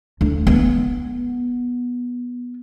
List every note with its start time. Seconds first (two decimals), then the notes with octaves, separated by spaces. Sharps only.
0.21 D2
0.47 B3